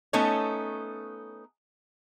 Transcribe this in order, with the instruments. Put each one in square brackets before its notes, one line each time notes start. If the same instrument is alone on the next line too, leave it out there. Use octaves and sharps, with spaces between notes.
[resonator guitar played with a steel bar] A3 B3 C#4 D#4 A4 C#5